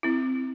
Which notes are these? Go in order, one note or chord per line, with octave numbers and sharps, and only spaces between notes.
C4 E4